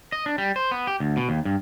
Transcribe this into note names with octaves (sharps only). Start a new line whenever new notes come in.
D#5
D4
G3
C5
B3
G4
D2
B2
D#2
G2